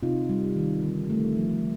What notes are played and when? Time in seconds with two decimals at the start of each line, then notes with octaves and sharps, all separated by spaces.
0.03 C3 D#4 F4
0.29 G3
0.56 D#3
0.84 D3
1.10 A3
1.37 F3